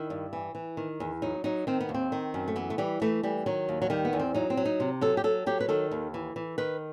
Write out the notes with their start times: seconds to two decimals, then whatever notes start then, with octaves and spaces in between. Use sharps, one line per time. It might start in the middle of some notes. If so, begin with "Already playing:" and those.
Already playing: D#3 E4
0.10 G2
0.33 E3
0.55 E3
0.77 D#3
1.00 E2
1.22 F#3 D#4
1.44 F#3 D#4
1.67 D#3 C4
1.81 B3
1.89 D#2
1.94 C4
2.12 D#3
2.34 F#2
2.48 A3
2.56 E3 B3
2.70 A3
2.78 E3 G3
3.02 E3 A3
3.23 E3 G3
3.46 D#3 F#3
3.69 D#2
3.82 F#3
3.90 D#3 G3
4.05 B3
4.13 E2
4.20 C4
4.34 F#3 D#4
4.50 C4
4.57 F#3
4.65 D#4
4.80 C3
5.01 F#3 A4
5.17 G4
5.24 F#3 A4
5.47 F#3 G4
5.60 B4
5.69 D#3 A4
5.91 D#2
6.14 E3
6.36 E3
6.58 D#3 B4